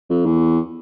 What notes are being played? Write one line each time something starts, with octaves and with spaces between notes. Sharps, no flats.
F2
E2